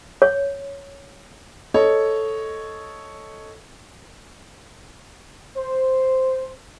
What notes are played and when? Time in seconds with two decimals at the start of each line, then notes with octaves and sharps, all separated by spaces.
0.22 C#5
1.74 A4 C#5 D#5
5.57 C5